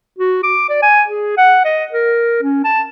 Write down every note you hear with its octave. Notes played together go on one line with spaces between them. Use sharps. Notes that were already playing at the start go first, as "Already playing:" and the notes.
F#4
D6
D5
G#5
G#4
F#5
D#5
A#4
C#4
A5